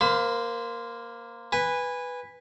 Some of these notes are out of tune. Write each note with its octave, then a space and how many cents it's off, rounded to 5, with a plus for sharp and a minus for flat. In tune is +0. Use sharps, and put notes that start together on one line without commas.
A#3 +0 C5 -15 B5 +30
B4 +0 G#5 -20